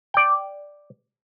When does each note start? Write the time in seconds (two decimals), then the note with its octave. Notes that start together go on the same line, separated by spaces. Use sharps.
0.14 D5 G5